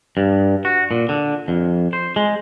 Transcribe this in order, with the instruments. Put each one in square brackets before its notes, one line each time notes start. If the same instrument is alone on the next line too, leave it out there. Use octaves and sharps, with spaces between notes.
[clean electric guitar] G2
F#4
A#2
D3
F2
C5
G#3